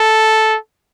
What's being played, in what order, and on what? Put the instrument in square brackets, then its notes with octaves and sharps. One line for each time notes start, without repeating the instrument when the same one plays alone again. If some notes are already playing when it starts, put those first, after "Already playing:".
Already playing: [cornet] A4